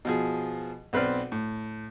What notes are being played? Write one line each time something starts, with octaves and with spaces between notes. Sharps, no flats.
B2 F3 G#4
B1 C4 B4 C5 D5 F6
A2